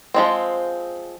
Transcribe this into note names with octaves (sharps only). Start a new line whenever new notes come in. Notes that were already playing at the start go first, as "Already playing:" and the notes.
F3 G#3 C4